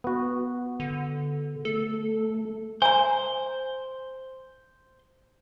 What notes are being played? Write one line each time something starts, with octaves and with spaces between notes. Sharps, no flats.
B3 F#4
D3
A3 A4
C5 G#5 A#5